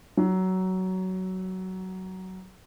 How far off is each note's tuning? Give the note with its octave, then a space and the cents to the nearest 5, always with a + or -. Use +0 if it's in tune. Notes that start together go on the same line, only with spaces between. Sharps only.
F#3 +15